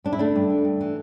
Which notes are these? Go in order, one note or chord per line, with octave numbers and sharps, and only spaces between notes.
G2 D4
E4
D3 A3 D4
G2
D3
G2
E3